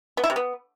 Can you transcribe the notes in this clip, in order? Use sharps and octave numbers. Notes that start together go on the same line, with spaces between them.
B3
E4
C3
B3